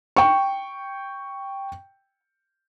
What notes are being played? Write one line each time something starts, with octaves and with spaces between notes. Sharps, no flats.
G5 C#6